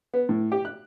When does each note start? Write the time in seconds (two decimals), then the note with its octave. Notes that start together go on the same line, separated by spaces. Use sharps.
0.14 B3
0.29 A2
0.52 G4
0.65 F#6